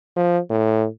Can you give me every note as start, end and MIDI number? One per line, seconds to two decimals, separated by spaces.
0.16 0.39 53
0.50 0.87 45